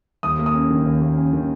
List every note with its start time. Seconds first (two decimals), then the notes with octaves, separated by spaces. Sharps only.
0.23 D#2 D#6
0.39 A#3
0.46 D#6
0.54 C#4
0.70 D#3
0.86 D#2
1.02 A#3
1.17 C#4
1.33 D#3